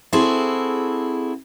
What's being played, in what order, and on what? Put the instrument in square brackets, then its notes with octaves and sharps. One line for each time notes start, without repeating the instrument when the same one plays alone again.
[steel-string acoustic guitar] C4 E4 F#4 G#4 A4